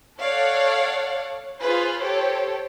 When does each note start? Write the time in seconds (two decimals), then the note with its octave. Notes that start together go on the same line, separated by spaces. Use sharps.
0.18 A4 C#5 D5 F5 F#5
1.60 F4 G#4 B4 C5
2.00 G4 A4 C5 C#5